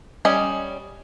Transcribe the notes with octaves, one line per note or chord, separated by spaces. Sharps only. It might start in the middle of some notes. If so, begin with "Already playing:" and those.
G3 C#4 D#5 G#5